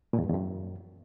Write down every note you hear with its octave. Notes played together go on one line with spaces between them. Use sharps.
A#2
E2
G2
E2
F#2